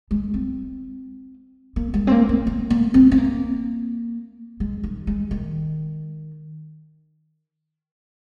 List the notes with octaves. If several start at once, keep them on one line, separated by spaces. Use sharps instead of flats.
G#3
C4
A#3
G#3
C4
A#3
C4
A#3
A#3
C4
C4
A#3
G#3
D#3
G#3
D#3